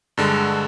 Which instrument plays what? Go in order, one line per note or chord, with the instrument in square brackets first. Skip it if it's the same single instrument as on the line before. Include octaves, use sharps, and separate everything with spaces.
[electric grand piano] G2 D3 G#3